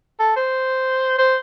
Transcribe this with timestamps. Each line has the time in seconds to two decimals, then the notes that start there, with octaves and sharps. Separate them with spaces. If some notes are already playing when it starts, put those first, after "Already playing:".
0.20 A4
0.36 C5
1.18 C5